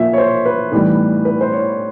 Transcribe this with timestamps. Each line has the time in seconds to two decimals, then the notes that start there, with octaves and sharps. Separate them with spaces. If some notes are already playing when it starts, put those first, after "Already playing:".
Already playing: A#2 F3 A#3 E5
0.13 C#5
0.18 C5
0.45 B4
0.71 A2 E3 G3 B3 D#4
1.25 B4
1.41 C5
1.52 C#5